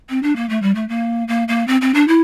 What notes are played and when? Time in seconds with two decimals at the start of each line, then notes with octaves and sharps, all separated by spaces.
0.10 C4
0.23 D4
0.36 A#3
0.49 A3
0.62 G3
0.75 A3
0.89 A#3
1.28 A#3
1.48 A#3
1.68 C4
1.81 C4
1.94 D4
2.08 E4